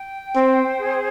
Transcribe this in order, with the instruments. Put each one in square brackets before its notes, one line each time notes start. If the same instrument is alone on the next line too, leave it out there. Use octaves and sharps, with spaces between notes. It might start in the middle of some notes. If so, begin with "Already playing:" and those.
Already playing: [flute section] G5
[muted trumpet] C4 [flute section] C5
[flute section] G#4